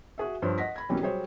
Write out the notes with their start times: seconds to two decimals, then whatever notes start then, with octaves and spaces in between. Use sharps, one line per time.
0.18 F#4 G#4 E5
0.42 G2 F3 C5 C#5
0.58 D#5 F#5 A#6 B6
0.76 B5 G#6
0.89 B2 E3 F#3 G3 A#3 C#4
1.01 F#3 G3 G#4 C5 C#5